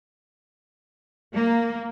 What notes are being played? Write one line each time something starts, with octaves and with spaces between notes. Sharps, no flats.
A#3